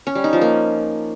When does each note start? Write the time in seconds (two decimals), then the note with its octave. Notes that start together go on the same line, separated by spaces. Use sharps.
0.07 C#4
0.15 G3
0.24 D#4
0.33 F3
0.41 A#3